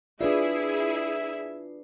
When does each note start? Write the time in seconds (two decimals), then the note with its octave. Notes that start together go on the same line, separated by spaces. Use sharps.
0.21 D4 E4 F4 G#4 B4 D5 E5